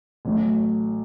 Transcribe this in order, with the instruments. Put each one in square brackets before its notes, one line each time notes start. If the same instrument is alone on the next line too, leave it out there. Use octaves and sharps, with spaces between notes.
[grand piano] A1 A2 F#3 A3